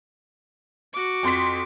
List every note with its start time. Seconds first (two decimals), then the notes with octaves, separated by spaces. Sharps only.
0.93 F#4 D6
1.23 F2 C6 B6